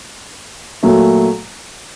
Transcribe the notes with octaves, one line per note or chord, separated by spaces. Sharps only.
A#2 F#3 A3